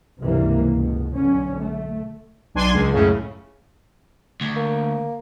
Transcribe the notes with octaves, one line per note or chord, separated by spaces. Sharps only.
C#2 G2 C3 E3 G3 A#3
C#2 B2
B1 D3 C#4
A3
B1 D4 G#5 C6
C#2
F#2 A2 C#3
D2
A#3